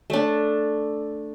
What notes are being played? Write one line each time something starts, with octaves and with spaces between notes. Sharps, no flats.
A3 D4